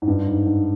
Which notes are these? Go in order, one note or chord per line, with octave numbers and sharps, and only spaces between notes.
G#2
G2
G#2
G#2